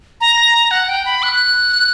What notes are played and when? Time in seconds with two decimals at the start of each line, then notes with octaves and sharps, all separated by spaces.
0.21 A#5
0.71 F#5
0.89 G5
1.05 B5
1.23 F#6